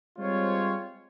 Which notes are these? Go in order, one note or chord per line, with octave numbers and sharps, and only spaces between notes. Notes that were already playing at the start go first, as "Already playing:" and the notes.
G3 G#3 C4 F4 C5 C#5